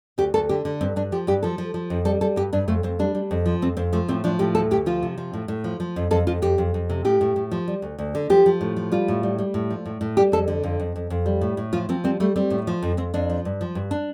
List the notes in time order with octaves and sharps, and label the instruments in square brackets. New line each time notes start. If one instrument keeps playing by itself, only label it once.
[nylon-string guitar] D2 G4
D2 A4
D3 G4
D3
G2 C4
G2 D4
F3 G4
G2 G4
F3 A4
F3
F3
F2
G3 A4
G3 A4
G2 G4
G2 D4
F2 A3
F2 C4
G3 D4
G3
F2
F3
F2 C4
F2 C4
F3 A3
A2 C4
F3 D4
A2 G4
D2 A4
D2 G4
F3 F4
C3
F3
A2
A2
F3
F3
F2
F2 A4
F2 F4
F2 G4
F2
F2
C3
A2 G4
A2
A2
F3
G3
D2
D2
D3
F3 G4
F3
A2
F3
G3 F4
A2
G3
G3
A2
F3
A2
A2
G3 G4
F2 A4
D3
F2
F2
F2
F2
G3
A2
A2
F3 F4
F3 C4
G3 C4
G3 A3
G3 C4
A2
F3
F2
F2 C4
F2 D4
F3
G2
F3
G2
D4